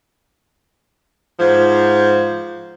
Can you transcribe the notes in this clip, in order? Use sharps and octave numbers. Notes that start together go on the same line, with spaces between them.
G#2 F3